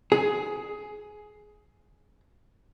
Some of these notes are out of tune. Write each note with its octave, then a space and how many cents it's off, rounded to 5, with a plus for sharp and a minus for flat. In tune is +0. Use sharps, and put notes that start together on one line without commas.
G#4 +15